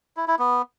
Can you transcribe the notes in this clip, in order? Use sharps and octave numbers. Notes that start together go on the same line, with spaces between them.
E4
E4
B3